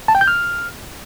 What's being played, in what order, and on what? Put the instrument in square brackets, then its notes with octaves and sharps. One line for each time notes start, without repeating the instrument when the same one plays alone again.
[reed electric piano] A5
G5
G6
F6